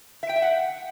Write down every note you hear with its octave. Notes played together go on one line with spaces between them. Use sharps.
E5
G5
E5
F#5